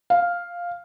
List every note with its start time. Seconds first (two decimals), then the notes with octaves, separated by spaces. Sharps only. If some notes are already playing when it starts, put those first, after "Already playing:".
0.10 F5